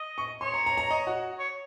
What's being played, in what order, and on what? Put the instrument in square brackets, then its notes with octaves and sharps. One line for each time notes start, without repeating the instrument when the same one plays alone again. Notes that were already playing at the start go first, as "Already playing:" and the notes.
Already playing: [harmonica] D#5
[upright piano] C#6
[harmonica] C#5 [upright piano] C6
[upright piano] A#5
A#5
A#5
D#5
F#4
[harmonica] C#5